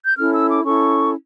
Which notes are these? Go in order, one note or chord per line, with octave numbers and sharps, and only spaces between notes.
G6
C#4 E4 A4 F6
E6
D6
C#4 E4 A4 C#6